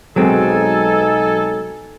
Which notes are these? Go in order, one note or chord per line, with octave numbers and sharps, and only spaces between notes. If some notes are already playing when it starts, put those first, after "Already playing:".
B1 F#3 G#3 C4 D#4 A4 G#5